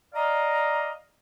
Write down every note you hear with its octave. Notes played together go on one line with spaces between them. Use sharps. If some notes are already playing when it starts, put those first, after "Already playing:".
D5 D#5 F5 A#5